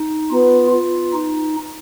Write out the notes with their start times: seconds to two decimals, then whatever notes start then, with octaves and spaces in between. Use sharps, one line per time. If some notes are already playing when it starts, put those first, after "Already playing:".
Already playing: D#4
0.30 B3 F4
0.71 F4
1.13 D#4